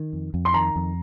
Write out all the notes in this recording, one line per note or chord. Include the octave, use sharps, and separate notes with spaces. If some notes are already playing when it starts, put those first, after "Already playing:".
Already playing: D#3
F2
F2
C6
D#3 A#5
F2